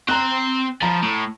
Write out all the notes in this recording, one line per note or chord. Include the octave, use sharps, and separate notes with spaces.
C4 G5 A#5 F#6
F3 A#5 B5
A2